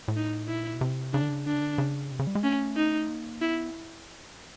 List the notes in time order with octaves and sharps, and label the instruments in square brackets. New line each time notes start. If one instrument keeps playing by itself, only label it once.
[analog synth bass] A2
[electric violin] D#4
[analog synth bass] A#2 [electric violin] E4
[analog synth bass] B2
C3
[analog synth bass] C#3 [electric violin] D4
[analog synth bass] D3
C#3
[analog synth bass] D3 [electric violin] D4
[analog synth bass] C#3
D3
C#3
C3
C#3
G3
G#3
[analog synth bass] A3 [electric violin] C#4
[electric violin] D#4
[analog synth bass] A#3
[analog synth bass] B3 [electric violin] E4